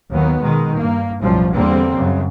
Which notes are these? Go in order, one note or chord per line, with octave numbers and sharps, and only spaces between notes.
D#2 D#3 F#3 B3
B2 D#3 G#3
G2 A#3
B1 F#2 A2 F3 G3
E2 D3 G3 A#3 C4
F#2 C#3